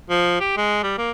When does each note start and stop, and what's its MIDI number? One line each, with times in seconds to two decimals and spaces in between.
0.09 0.38 53
0.40 0.52 67
0.57 0.82 56
0.83 0.95 55
0.98 1.11 58